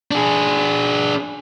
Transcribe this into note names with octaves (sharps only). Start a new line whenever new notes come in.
D4 G#4